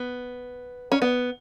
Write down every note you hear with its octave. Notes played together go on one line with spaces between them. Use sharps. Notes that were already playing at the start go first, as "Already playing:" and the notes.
Already playing: B3
C#4
B3